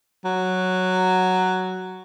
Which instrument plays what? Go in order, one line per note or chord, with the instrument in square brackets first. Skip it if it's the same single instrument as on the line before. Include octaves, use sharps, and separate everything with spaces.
[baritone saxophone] F#3